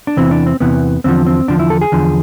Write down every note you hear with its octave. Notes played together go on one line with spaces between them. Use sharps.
D4
E2 C3 E3 C4
D4
C4
E2 C3 E3 B3
E2 D3 F3 C4
C4
E2 D3 F3 D4
E4
A4
G#4
E2 D3 F3